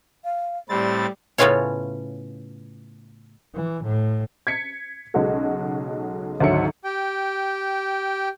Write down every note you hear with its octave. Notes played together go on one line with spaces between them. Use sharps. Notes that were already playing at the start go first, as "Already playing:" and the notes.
F5
A2 G3 C4 B5 A6
A2 C#3 B3 C#4 F4 C#5
E3
A2
G#6 B6 C#7
B1 C#3 G#3 F#4 A4
G#1 D2 G#2 F#3 E5 C#7
G4 G5